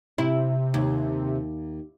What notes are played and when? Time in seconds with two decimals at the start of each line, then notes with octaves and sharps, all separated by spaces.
0.18 C3 E4
0.74 D#2